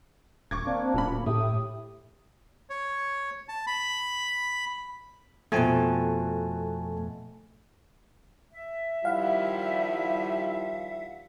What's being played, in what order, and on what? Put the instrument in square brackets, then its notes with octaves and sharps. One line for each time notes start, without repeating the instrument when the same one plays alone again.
[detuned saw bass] D#1 [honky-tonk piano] C#6 D6 G#6
[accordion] A#3 D4 [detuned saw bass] C4
[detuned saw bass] D1 [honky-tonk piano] A#2 C#4 B5
[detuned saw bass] A2 [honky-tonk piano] E4 G4 [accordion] D#6
[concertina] C#5
A5
B5
[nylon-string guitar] F2 B2 [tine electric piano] A3 G#5 A5
[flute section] E5
[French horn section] D#3 F3 G3 [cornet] E4 [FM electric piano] F5 F#5